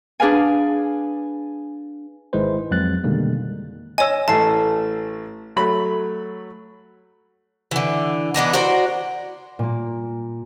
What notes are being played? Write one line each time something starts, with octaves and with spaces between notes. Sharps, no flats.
D4 G#4 B4 F5 G#5
G#1 D#3 G#3 E4 B4 C5
F2 F#3 G#3 F#6 A6
B2 D3 D#3 G3 G#3 A#3
C#5 D#5 G#5 E6
A1 A3 A5 C7
F#3 A3 B5
D3 E3
E3 B3 D4 D#4
F#4 A#4 C5 D5
A#2 A#3